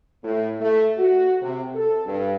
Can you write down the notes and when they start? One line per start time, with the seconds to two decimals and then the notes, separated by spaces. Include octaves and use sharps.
0.22 A2
0.60 A3
0.98 F#4
1.41 C3
1.75 A4
2.05 G2